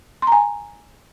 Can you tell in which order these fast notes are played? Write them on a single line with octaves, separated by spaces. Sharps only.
C6 A#5 G#5